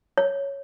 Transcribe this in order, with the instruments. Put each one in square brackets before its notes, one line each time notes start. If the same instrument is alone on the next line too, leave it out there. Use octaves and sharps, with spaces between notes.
[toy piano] C#5